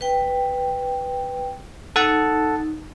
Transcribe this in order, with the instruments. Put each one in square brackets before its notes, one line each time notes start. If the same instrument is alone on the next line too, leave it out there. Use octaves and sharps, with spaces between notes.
[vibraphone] B4 G5
[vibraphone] D#4 [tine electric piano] A4 F#5 A5